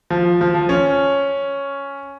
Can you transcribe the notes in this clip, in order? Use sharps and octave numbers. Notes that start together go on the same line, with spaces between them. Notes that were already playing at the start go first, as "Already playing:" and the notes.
F3
F3
F3
C#4